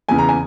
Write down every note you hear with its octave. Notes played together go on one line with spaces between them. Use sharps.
E2 C#3 E3 G#5
A#5
G#5